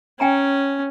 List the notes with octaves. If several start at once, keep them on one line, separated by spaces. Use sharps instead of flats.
C#4 G5 G#5 A#5